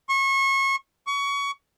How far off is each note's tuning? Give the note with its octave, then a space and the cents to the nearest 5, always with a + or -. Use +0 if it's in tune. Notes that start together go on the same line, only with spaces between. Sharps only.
C#6 -30
C#6 +25